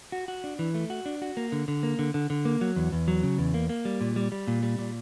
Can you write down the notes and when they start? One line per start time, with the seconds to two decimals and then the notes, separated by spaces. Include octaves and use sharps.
0.12 F#4
0.28 F#4
0.44 D4
0.59 E3
0.74 A3
0.90 F#4
1.06 D4
1.22 F#4
1.37 A#3
1.52 D3
1.68 D3
1.83 A#3
1.99 D3
2.14 D3
2.30 D3
2.45 A#3
2.61 F#3
2.76 E2
2.92 E2
3.08 F#3
3.23 C#3
3.38 E2
3.54 A#3
3.69 A#3
3.85 G3
4.01 A#2
4.16 G3
4.32 G3
4.47 A#2
4.63 G3
4.79 A#2